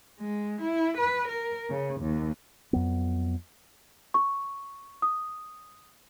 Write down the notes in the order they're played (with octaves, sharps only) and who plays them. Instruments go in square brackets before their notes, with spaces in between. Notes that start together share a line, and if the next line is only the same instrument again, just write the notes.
[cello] G#3
E4
B4
A#4
C#3
D#2
[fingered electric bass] F2 F#3 B3
[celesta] C#6
D#6